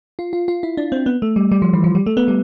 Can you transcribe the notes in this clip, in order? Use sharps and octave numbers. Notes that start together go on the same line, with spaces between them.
F4
F4
F4
E4
D4
C4
B3
A3
G3
G3
F3
E3
F3
G3
A3
B3
G3